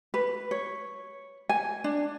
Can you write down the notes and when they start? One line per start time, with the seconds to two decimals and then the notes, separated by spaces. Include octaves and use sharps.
0.14 B4
0.51 C#5
1.49 G#5
1.84 D4